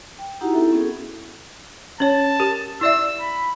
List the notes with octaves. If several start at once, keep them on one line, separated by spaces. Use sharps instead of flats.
G5
D#4 E4 F#4 G4 F#5 A#5
C4 E4 A4 E5
B3 C#4 F#4 G#4 A4
C#4 C#5 A5
G4 A#4
E4 D5 E5 E6
B5